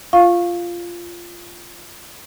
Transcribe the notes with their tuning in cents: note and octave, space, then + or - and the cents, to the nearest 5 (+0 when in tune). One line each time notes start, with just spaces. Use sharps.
F4 -10 F5 +0 C#6 -20